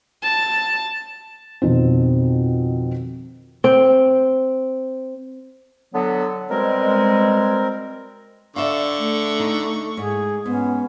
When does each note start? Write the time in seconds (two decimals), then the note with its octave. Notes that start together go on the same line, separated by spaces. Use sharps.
0.24 A5
1.62 F2 B2 D#3 C4
3.64 C4
5.94 D3 F#3 B3
6.50 B2 G3 G#3 C4 A#4
8.56 D3 D5 E5 F5 C#6
8.99 A3
9.40 D#4
9.97 G#2 G#4
10.46 G#2 B3 C#4